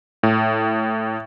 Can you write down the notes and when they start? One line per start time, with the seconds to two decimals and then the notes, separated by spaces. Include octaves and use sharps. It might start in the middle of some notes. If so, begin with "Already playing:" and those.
0.23 A2